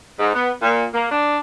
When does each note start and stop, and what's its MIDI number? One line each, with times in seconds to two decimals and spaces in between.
0.19 0.31 44
0.34 0.51 59
0.62 0.85 46
0.94 1.08 58
1.11 1.38 62